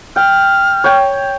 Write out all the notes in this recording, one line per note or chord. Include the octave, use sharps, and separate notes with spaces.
G5 F6
C#5 G5